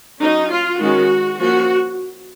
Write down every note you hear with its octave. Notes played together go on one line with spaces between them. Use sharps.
F#3 C#4 D#4
F4
D#3 G#3 C#4 F#4
F3 A#3 C#4 F#4